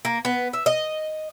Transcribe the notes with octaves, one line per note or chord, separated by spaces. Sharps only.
A#3
B3
E5
D#5